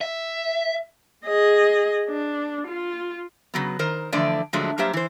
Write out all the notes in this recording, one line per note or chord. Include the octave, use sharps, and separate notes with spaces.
E5
G#4 D#5
D4
F4
C#3 F#3 B3
D#3 A#4 C5
D3 E3 F3 A3 D5
A#2 D3 F3 F#3 G#3 A3
G2 F#3 A#3 G4 C5 E5
E3 C5